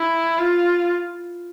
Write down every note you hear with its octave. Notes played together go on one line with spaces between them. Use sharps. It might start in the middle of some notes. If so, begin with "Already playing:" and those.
Already playing: E4
F4